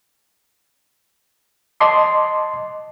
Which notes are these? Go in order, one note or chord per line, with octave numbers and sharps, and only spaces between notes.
D#5 A5 C6 D6